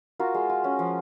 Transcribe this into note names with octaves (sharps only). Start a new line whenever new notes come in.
F4 F#4 A#4
G#3
F4
C#4
F3